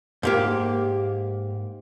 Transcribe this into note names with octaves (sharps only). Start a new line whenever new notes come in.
G#2 A#3 G4